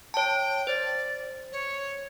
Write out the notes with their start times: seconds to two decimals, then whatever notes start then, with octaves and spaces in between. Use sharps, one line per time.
0.14 C#5 G5 A5
0.67 C5 D5
1.52 C#5